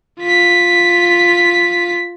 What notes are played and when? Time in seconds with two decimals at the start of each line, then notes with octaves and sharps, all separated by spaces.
0.20 F4 B6